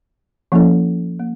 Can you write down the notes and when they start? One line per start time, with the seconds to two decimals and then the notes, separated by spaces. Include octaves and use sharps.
0.52 F3 A#3 C#4 E4 A4
1.19 A#3